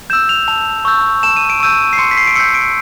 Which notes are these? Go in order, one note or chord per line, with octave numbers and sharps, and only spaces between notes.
E6 G6 E7
F7
A5 F7
C#6 E6 G6
A5 E7
D#7
D7
C#6 E6 G6 D#7
C7
C6 C#7
B6
C7
D7
E6 G6 C#7
D7